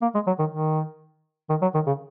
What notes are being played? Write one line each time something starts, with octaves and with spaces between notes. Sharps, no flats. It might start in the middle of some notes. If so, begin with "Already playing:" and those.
A#3
G#3
F#3
D#3
D#3
D#3
F#3
D#3
C#3